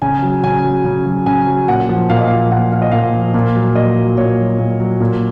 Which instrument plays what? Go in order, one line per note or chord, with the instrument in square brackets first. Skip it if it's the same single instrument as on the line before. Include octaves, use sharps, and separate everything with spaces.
[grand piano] C#3 G#5
F#3
C#3 G#5
F#3
C#3
F#3
C#3 G#5
F#3
A#2 F#5
F3
A#2 F5
D#5
F3 F5
A#2 F#5
F3 F5
D#5
A#2 F5
F3
A#2
F#3
A#2 D#5
F#3
A#2 C#5
F#3
A#2
F#3
A#2